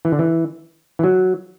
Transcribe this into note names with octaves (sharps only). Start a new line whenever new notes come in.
E3
D3
E3
E3
F#3